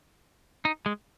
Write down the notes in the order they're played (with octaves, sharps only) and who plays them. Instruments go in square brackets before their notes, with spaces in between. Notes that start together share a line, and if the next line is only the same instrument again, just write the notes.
[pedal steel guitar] D#4
G#3